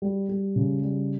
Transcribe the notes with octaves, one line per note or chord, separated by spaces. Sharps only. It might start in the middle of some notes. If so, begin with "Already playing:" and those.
G3
G3
C#3
G3